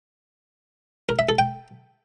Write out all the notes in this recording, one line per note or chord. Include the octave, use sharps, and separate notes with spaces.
A#4
E5
A4
G5